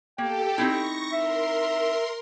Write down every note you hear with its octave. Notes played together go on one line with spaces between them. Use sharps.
A#3 G4 A4 G5
C4 D#4 E4 C#6 A#6
A#4 E5 C6